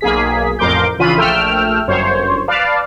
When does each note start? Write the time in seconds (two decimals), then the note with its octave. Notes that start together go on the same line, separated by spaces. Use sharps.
0.01 B1 A#3 G#4 B6
0.59 A1 F2 A#4 C6 D6 G6
0.98 A#1 C#3 E3 F4 B5 D#7
1.17 A#1 A3 G5 E6 F6
1.88 G1 F#2 C5 C#5
2.48 B4 D5 F5 A5